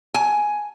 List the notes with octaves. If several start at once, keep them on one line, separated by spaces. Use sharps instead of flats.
G#5